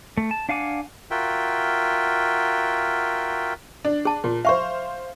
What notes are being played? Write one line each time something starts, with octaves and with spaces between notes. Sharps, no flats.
A3
A5
D4 F5 F#5 G#5 D6
F4 F#4 A#4 E5 G5
D4
G#4 A5
A#2
C5 E5 F5 C#6